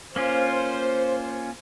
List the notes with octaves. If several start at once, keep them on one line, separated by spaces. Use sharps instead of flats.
A#3 C#4 F4 C5